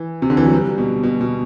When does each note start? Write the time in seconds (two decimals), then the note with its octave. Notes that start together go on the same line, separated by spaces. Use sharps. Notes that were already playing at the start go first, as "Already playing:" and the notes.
Already playing: E3
0.22 C3
0.30 D3
0.37 E3
0.45 F#3
0.52 G3
0.78 B2
1.03 B2
1.21 B2